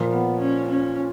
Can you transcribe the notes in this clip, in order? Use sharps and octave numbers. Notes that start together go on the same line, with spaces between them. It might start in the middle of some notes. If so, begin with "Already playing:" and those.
Already playing: A#2 F3 A#3 F4
B3
C#4
C#4